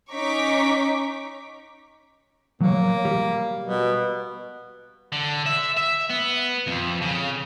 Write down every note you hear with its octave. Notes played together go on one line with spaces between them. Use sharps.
C#4 D#4 C#6 D6 B6
F#3 A#3 C#5
G3
B2
D3
E5
E5
B3
F2
C#3